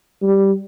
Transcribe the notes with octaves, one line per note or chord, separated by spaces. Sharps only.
G3